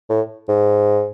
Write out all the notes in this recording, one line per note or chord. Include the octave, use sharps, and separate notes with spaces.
A2
G#2